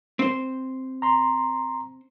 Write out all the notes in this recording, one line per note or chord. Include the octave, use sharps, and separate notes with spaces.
C4 C5
A#5 C6